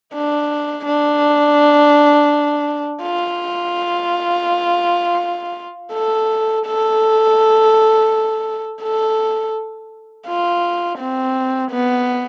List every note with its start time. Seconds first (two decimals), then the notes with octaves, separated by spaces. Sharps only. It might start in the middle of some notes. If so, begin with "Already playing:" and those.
0.14 D4
0.86 D4
3.03 F4
5.93 A4
6.66 A4
8.83 A4
10.27 F4
10.99 C4
11.71 B3